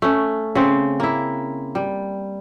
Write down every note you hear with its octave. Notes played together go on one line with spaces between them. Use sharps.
A3 C#4
C#3 C4
A#3 E4
G3